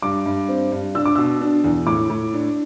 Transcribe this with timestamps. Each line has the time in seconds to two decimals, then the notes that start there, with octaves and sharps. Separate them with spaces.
0.02 G2 D6
0.26 G2
0.49 C4
0.72 G2
0.95 D4 E6
1.05 D6
1.15 B2 E6
1.41 D4
1.64 E2
1.87 A2 D6
2.10 A2
2.34 D4